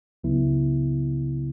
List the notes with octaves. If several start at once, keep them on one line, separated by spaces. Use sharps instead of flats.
C#2 C#3 F#3 B3 E4